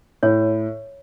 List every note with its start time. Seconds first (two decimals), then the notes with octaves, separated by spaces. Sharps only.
0.23 A2 C#5